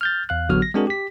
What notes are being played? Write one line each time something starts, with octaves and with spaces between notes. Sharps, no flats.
F6 G6 A6
E2 F5 F#6
A1 D3 F#3 B3 F#4 F6
A#6
G#3 C4 D4 F#4 G#4 A#4
G4 B6